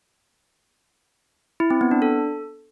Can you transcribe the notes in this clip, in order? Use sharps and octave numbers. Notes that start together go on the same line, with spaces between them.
E4
C4
B3
D4
A4